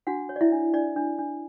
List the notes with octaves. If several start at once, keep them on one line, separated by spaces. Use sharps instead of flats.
D4 F#4 F#5
C#5
D5
E4 E5
D4
D4 D5
D4
D4